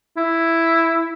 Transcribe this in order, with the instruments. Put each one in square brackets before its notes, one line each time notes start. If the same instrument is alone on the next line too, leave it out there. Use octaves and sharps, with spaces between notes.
[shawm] E4